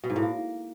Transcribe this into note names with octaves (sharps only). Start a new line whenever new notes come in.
B2
G#2
A2
A#3